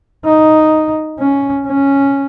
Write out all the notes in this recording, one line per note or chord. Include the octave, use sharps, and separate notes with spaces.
D#4
C#4
C#4